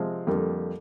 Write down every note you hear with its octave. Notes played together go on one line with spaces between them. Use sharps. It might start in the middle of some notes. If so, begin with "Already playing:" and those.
Already playing: C3 F3 G#3 C4
F2 D3 G3 A#3